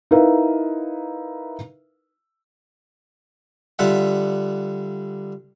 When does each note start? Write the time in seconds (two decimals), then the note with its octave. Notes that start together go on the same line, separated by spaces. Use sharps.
0.11 D#4 E4 A#4 B4 E5 F5
3.79 D3 G3 F4 E5 F#5